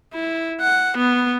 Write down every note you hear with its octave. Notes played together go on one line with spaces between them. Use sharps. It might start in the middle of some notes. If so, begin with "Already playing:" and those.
E4
F#5
B3